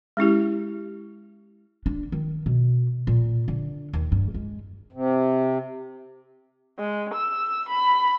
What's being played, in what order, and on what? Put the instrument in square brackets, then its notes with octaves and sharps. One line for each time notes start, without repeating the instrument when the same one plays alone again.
[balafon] G#3 C#4 E4 G4
[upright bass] D4
D#3
B2
A#2
D3
D#2
G2
G#3
[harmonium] C3
[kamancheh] G#3
E6
B5